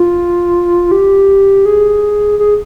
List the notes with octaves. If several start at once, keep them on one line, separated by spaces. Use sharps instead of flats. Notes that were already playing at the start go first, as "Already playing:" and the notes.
Already playing: F4
G4
G#4
G#4